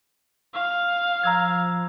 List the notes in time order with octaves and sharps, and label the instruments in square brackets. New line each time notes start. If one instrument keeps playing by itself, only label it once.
[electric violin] F5
[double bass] F3 [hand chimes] A#5 E6 G#6